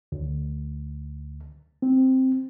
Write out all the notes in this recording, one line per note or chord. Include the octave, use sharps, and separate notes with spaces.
D2
C4